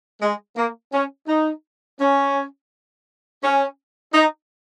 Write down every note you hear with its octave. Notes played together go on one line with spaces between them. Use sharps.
G#3
A#3
C#4
D#4
C#4
C#4
D#4